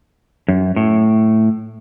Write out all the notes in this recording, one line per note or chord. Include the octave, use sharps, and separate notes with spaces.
F#2
A2